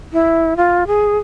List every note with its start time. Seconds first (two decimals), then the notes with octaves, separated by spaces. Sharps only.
0.13 E4
0.57 F4
0.87 G#4